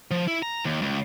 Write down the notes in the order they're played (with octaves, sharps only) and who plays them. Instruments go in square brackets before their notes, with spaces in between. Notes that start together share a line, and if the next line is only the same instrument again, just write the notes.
[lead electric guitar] F3
E4
A#5
D#2
C#2